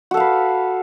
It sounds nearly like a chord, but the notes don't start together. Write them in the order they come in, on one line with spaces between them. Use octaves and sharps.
F#4 A4 F5 B4